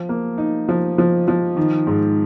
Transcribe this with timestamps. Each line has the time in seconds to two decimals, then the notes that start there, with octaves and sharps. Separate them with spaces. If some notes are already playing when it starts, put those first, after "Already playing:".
Already playing: F3
0.09 A#3
0.38 D#4
0.69 F3
0.98 F3
1.28 F3
1.56 D#3
1.87 G#2